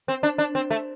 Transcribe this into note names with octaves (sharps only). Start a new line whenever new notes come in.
C4
D4
D4
C4
A3